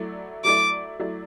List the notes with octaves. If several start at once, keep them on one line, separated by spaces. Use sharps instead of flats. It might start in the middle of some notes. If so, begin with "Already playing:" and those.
Already playing: F#3 A3 E4 D5
F#3 A3 E4 D5 D6
F#3 A3 E4 D5